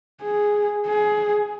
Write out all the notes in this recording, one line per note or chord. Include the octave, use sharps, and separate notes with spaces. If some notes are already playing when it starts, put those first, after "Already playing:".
G#4
G#4